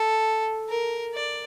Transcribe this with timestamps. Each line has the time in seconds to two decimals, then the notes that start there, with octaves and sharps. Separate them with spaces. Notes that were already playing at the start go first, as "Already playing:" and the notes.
Already playing: A4
0.69 A#4
1.15 D5